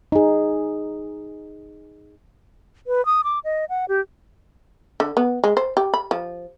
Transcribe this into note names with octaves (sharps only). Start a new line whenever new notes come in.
D#4 G#4
B4
D#6
D6
D#5
F#5
G4
D3
B3
G#3
C5
G4
B5
F3